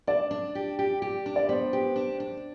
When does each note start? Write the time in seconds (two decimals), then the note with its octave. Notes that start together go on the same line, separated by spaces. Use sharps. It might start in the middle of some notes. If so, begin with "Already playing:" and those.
0.07 D4 D5
0.31 D4
0.55 G4
0.79 G4
1.02 G4
1.26 D4
1.36 D5
1.49 B3 C5
1.73 G4
1.96 D4
2.20 D4